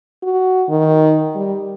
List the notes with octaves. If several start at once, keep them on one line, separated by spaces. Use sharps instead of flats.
F#4
D#3
G3